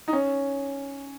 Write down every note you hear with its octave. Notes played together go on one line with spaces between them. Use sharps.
D#4
C#4